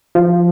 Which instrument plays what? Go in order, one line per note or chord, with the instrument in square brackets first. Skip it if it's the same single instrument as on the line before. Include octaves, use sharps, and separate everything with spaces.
[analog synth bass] F3